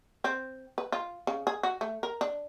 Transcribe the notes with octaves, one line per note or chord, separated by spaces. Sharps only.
C4
B4
F4
C#3
G#4
F#4
A3
A#4
D4